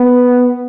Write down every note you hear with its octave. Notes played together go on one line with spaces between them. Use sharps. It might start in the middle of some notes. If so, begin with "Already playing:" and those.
Already playing: B3